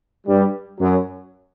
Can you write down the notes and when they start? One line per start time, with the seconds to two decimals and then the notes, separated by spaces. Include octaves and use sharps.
0.27 G2 G3
0.79 F#2 F#3